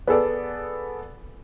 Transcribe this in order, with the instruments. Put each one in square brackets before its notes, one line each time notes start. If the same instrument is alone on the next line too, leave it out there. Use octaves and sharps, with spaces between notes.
[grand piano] B3 G#4 A4 D5